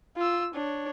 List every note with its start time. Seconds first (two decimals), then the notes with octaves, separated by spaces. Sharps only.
0.17 F4 E6
0.54 D4 C#5